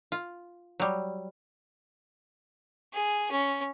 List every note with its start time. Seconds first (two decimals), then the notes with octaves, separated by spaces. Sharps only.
0.12 F4
0.80 F#3 G3
2.94 G#4
3.31 C#4